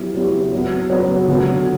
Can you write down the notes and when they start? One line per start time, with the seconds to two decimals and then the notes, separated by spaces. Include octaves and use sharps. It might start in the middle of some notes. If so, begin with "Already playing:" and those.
Already playing: F#3 B3 E4 G4
0.14 F#3 B3 E4 G4
0.52 F#3 B3 F#4
0.90 F#3 B3 F#4
1.28 D3 F#3 B3 F#4